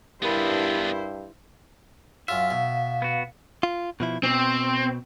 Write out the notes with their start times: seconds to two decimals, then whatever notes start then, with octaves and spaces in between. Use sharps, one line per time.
0.22 G2 B3 D4 E4 G4 A#4 C5 B5
2.28 F#2 F4 E5 F5
2.51 B2
3.02 B3 F#4
3.63 F4
4.00 B2 F3 E4
4.23 B2 C4